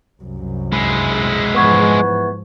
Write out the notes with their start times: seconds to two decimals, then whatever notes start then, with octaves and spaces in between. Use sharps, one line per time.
0.21 C2 F#2
0.73 G#3 E4
1.54 G#2 E3 F3 B3 B4 C#6 G#6